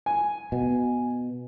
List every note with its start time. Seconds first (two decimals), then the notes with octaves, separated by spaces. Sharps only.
0.06 G#5
0.52 B2